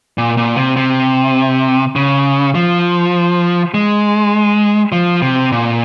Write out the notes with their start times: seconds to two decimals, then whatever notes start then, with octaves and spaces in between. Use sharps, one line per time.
0.18 A#2
0.37 A#2
0.57 C3
0.76 C3
1.96 C#3
2.55 F3
3.74 G#3
4.92 F3
5.22 C3
5.52 A#2